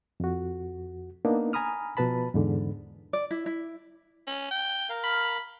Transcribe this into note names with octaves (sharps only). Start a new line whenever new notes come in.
F2 F#4
A#3 B3 D4 D#4
G#5 A#5 B5 D#6 F6
B2 F3 B4 A5 B5
E2 G#2 D3
D5
E4
E4
C#4
G5
A#4 F5
B5